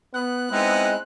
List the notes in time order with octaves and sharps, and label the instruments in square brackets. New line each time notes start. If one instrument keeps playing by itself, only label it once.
[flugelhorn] B3 [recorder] F#6
[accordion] G#3 [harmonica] B3 D#4 E4 [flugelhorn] C4